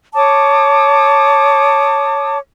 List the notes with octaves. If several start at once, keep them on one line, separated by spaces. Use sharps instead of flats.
C#5 A5 D6 D#6